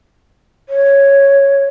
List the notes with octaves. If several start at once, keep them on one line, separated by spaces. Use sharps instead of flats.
C#5